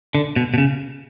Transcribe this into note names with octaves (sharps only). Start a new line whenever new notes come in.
D3
B2
B2
C#3